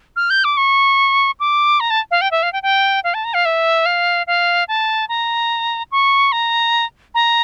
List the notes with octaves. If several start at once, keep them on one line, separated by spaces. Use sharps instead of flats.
F6
G6
D6
C#6
D6
A#5
A5
F5
G5
E5
F5
G5
G5
F5
A5
A#5
F5
E5
F5
F5
A5
A#5
C#6
A#5
A#5